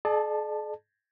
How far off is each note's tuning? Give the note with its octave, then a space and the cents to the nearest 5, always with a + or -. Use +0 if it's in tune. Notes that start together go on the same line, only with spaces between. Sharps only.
G#4 +45 D5 +40 A5 +0